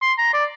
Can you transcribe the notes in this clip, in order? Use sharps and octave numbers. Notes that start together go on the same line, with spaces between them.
C6
A#5
D5